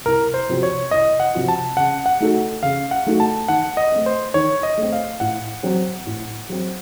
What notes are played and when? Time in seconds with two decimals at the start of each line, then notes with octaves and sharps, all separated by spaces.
0.06 C2 A#4
0.34 C5
0.49 C3 F3 C4 F#4
0.63 C#5
0.91 C2 D#5
1.20 F#5
1.35 C3 F3 C4 F#4
1.48 A5
1.77 C#3 F#5
2.06 F#5
2.20 A3 D#4 F#4 A4
2.63 C#3 F5
2.91 F#5
3.06 A3 D#4 F#4 A4
3.20 A5
3.48 D#3 F#5
3.77 D#5
3.92 A3 C4
4.06 C5
4.34 D#3 C#5
4.63 D#5
4.77 A3 C4
4.93 F5
5.20 A2 F#5
5.63 F#3 C4
6.07 A2
6.49 F#3 C4